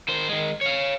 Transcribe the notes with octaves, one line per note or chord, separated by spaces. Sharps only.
D#3 C5
D#3 G#3
C#5 F5